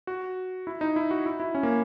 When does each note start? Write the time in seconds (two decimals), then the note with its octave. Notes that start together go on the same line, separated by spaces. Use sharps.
0.07 F#4
0.67 E4
0.81 D#4
0.96 E4
1.11 F#4
1.26 E4
1.40 E4
1.55 C#4
1.63 A#3